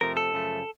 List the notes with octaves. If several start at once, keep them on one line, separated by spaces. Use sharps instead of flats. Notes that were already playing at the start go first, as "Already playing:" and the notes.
F2 C3 F3 A3 A#4
A4
F#2 C#3 F3 A3